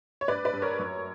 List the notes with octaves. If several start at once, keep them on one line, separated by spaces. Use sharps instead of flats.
C#5
G2 B4 D5
B4 D5
G2
A#4 C#5
F#2